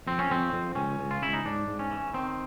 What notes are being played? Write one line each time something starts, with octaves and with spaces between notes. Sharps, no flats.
F2 C4
C#4
F2 C4
F2
C#2 C#4
C#2
F4
C#2 E4
D#4
G#2 D4
G#2
C#4
E3
D#3 C4